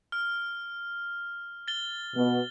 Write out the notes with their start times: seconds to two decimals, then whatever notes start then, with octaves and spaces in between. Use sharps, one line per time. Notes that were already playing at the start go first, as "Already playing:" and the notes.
0.12 F6
1.68 A6 G7
2.15 B2